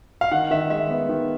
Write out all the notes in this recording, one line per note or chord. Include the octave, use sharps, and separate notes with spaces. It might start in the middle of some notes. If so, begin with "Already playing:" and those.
F5
D#3 F#5
D#3 E5
G#3 E5
B3
D#3